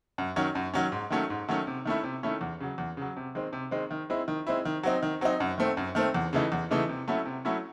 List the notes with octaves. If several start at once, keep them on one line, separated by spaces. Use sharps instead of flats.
F#2
D#3 F#3 C#4
F#2
D#3 F#3 C#4
G#2
D#3 F#3 A3 C#4
G#2
D#3 F#3 A3 C#4
C3
D#3 A3 C#4 E4
C3
D#3 A3 C#4 E4
E2
C#3 F#3
E2
C#3 F#3
C3
D#3 G#3 C4
C3
D#3 G#3 C4
D#3
G#3 C4 E4
D#3
G#3 C4 E4
D#3
F#3 C4 D#4
D#3
F#3 C4 D#4
F#2
D#3 A3 C4
F#2
D#3 A3 C4
E2
C#3 E3 A3 D#4
E2
C#3 E3 A3 D#4
C3
F#3 A3 C#4 E4
C3
F#3 A3 C#4 E4